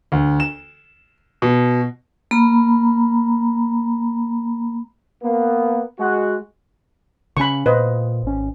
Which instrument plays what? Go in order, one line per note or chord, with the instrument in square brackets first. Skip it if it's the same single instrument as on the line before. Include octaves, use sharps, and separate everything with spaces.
[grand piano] D2
E7
B2
[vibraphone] A#3 A#5 B5
[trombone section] A#3 B3
G#3 F#4
[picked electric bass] C#3 C#4 [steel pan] B5 C#6
[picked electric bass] A#2 [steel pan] B4 C5 D#5
[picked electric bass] G#1 C#4